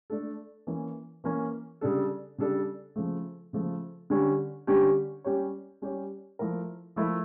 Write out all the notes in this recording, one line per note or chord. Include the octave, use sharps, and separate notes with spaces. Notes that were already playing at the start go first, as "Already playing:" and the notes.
A3 D4 A4
E3 A#3 C#4
E3 A#3 C#4
C#3 G3 D4 A4
C#3 G3 D4 A4
C#3 F3 A3
C#3 F3 A3
D3 G3 C#4 G4
D3 G3 C#4 G4
G3 C#4 G4 C#5
G3 C#4 G4 C#5
F3 A3 E4 A#4
F3 A3 E4 A#4